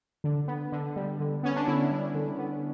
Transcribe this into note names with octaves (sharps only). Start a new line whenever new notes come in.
D3
B3
D3
G3
D3
B3 C#4
D4
D3 E4
G3
D3
B3